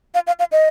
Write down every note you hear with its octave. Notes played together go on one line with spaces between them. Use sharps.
F5
F5
F5
D#5